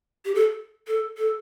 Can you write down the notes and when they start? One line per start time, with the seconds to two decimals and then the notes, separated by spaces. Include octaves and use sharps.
0.25 G4
0.35 A4
0.87 A4
1.17 A4